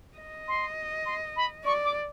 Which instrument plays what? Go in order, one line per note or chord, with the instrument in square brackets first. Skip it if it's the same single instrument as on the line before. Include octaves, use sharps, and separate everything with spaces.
[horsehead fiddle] D#5
[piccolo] C6
C6
B5
[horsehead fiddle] D5 [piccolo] C#6
[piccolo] D6